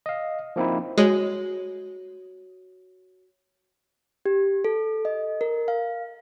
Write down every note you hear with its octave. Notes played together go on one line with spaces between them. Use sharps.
D#5 F5
F3 A#3 C4 D#4 E4
G#3 F#4 C#5 F#7
G4
A4
D#5
A#4
F5